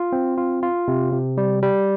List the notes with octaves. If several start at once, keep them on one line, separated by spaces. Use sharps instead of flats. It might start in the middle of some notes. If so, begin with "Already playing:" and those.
Already playing: F4
C4
F4
F4
C3
C3
G3
G3